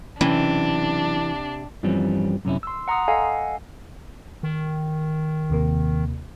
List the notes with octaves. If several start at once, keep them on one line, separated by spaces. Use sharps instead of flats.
B1 C3 E3 C#4 D4 B5
G2 E3 F3 G3 C4 C#4
F#2 C3 C#4 E4
C6 E6
F#5 A#5 C6 D#6
A4 D#5 F5 F#5 G#5
D#3
D#2 C3 A#3